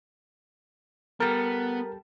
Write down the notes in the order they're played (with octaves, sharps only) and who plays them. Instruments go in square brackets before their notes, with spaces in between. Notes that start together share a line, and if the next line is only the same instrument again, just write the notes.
[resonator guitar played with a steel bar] G3 A4 [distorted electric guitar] B3 [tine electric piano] A#4